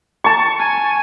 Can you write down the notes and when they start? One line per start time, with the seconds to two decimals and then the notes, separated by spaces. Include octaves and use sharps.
0.24 A5 C#6
0.59 G#5